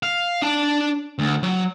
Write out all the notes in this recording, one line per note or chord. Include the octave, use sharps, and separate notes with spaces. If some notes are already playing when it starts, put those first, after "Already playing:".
F5
D4 A5
D2
F#3